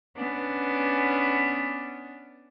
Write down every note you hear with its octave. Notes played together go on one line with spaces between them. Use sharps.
B3 C#4 D4